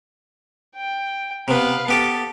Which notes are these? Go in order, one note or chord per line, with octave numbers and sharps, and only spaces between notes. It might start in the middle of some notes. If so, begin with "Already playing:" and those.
G5
C3 B3 B4 F5
B3 G4 A4 A5